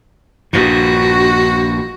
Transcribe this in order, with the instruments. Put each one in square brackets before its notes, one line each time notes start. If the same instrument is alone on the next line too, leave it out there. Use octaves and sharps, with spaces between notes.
[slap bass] A#1 G2 A#2 [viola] F#4